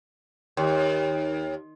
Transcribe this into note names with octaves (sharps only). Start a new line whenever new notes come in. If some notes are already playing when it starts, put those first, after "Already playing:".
D#2